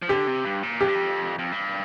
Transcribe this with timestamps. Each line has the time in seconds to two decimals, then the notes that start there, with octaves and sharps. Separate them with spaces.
0.02 F3
0.09 D3 G4
0.27 C3
0.45 G2
0.63 A#2
0.81 F2 G4
0.88 G2
0.95 F2
1.39 F2
1.52 G2